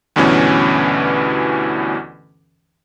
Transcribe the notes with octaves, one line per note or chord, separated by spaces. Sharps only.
D2 G2 B2 E3 C#4